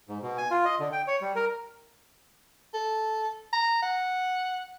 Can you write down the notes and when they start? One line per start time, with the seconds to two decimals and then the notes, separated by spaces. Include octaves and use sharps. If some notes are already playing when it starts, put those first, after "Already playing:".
0.09 G#2
0.22 B2
0.38 G#5
0.51 F4
0.65 D#5
0.80 D3
0.92 G5
1.07 C#5
1.21 G3
1.36 A#4
2.74 A4
3.53 A#5
3.83 F#5